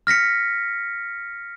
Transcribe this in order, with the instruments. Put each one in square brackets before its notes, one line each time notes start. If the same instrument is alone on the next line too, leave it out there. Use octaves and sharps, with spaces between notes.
[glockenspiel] F6 A#6 B6 C#7